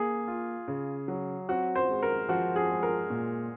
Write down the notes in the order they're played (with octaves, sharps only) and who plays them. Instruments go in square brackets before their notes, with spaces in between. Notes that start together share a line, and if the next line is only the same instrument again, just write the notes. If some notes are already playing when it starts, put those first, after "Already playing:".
Already playing: [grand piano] A#3 [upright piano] G#4
[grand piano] F4
C#3
F#3
[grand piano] C4 [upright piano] F#4
[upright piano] C5
[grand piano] G#3
[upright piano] A#4
[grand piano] F3 [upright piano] F#4
[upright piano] G#4
[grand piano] G#3
[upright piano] A#4
[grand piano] A#2